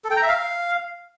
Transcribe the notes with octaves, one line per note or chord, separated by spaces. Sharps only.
A4
G5
A#5
E5
F5